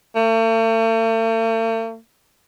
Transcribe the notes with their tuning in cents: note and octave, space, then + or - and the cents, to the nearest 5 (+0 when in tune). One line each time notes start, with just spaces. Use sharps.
A3 +45